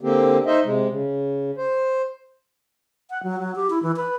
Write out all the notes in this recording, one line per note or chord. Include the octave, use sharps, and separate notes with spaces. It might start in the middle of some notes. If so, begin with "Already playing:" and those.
D3 A#3 C4 G4
D#4 C5 D#5 E5
C3 G#3
C#3
C5
F#5
F#3
F#3
G4
E4
E3
B4